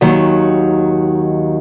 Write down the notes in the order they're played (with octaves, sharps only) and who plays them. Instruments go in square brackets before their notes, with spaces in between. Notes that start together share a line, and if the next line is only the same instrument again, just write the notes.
[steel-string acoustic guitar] D#2 D#3 F#3